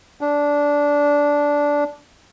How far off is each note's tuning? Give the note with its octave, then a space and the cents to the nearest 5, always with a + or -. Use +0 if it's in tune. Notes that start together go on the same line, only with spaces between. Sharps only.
D4 -15